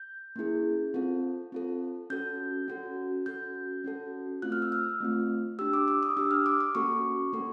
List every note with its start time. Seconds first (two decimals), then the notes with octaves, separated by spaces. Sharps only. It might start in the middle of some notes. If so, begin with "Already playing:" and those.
Already playing: G6
0.36 A#3 C#4 E4 G#4
0.94 C4 F4 A4
1.52 C4 F4 A4
2.10 C#4 F#4 A4 G6
2.68 C#4 F#4 A4
3.26 C#4 F#4 A4 G6
3.84 C#4 F#4 A4
4.42 A3 C4 F4 F#6
4.52 F6
4.62 E6
4.72 F6
5.01 A3 C4 F4
5.59 D4 G4 E6
5.73 D6
5.88 D6
6.03 D#6
6.17 D4 G4 E6
6.31 F6
6.46 D6
6.60 D6
6.75 A#3 C#4 F#4 A4 C#6
7.33 A#3 C#4 F#4 A4